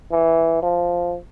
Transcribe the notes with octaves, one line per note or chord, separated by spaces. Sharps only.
E3
F3